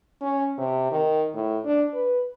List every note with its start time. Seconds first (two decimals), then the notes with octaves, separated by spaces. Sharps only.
0.21 C#4
0.58 C3
0.91 D#3
1.34 A2
1.65 D4
1.94 B4